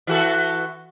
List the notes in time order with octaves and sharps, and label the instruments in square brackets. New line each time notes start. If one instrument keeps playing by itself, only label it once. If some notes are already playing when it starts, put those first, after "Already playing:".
[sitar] E3 F#4 A4